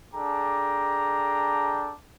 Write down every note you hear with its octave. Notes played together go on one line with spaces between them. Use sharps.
D4 G#4 A4 G5 A#5 D6